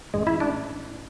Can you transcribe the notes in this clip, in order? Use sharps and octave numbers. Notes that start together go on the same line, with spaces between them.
A1 G#3
E4
A1
D4